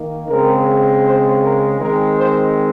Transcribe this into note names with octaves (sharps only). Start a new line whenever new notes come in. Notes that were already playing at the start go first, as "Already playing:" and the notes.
Already playing: D#3 A#3
C#3 G#3 C4 A#4
C5
A#4
D#3 G#3 C4 A#4
C5